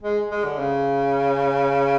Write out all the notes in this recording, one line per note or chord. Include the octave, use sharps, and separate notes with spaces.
G#3
G#3
D3
C#3